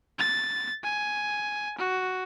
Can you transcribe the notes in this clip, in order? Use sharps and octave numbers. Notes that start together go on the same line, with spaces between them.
A6
G#5
F#4